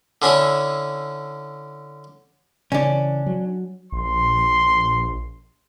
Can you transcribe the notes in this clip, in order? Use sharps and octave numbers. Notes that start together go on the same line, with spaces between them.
D3 C#4 D4 E4
C#3 E3 C#4 D4
F#3
A#1 C6